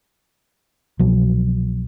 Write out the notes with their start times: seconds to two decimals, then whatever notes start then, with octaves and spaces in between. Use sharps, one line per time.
0.99 C2 B2 F3 F#3